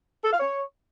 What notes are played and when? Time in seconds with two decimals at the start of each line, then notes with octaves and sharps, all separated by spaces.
0.24 A4
0.32 F5
0.40 C#5